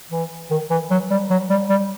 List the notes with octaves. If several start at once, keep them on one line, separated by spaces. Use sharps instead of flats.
E3
D#3
E3
F#3
G3
F#3
G3
G3